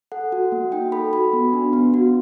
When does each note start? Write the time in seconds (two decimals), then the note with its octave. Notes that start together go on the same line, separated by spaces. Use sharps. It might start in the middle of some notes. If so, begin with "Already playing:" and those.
0.12 A4 F#5
0.32 F#4
0.52 A#3
0.72 D#4 G5
0.92 A4 B5
1.13 F#4 B5
1.33 B3
1.53 D4
1.73 B3
1.94 F#4